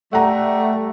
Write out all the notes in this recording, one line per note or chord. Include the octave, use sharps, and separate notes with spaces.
G3 A3 F#5 A#5